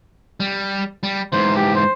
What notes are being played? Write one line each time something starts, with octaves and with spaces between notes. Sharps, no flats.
G3
G3
G#2 E3 C5
G4
C5